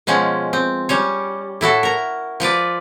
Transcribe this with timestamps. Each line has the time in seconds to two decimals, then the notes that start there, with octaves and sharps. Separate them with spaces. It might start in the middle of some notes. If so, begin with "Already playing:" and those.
0.07 B2 F3 G#3 C#4
0.53 C4
0.89 G3 C#4 C#5
1.61 A2 E4 F#4 A4
1.83 A#4 A#5
2.40 F3 F4 B4 D5